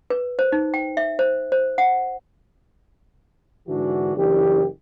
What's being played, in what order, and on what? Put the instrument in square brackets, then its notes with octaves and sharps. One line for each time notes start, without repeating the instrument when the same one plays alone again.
[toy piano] B4
C5
D#4
G5
E5
C5
C5
F#5
[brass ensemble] G#2 D3 E3 D4 F#4
F#1 E3 D4 G4